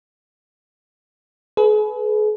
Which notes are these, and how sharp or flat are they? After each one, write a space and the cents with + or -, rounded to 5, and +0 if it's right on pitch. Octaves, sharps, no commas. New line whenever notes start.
G#4 +40 B4 +0